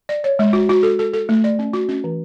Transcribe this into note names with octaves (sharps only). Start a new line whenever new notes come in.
D5
C#5
G#3
F#4
F#4
A4
A4
A4
A3
D5
C#4
F#4
C#4
E3